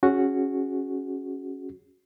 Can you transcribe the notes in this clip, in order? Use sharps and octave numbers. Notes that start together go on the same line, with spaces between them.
C#4 F#4 G#4